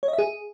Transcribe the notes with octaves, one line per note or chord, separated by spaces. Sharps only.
C#5
D#5
E5
G#4